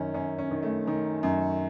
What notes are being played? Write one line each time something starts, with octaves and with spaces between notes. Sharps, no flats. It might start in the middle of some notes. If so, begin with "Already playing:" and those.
Already playing: F#2 D#3 C#4
F#2 C#4
C#4
D#3
A3
D#3
F#2